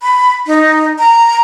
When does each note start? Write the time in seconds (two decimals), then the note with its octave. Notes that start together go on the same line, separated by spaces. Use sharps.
0.03 B5
0.47 D#4
0.99 A#5